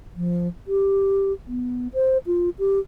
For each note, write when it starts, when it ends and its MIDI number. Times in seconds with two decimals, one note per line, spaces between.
0.16 0.48 53
0.67 1.33 67
1.47 1.88 59
1.94 2.18 72
2.26 2.50 65
2.59 2.79 67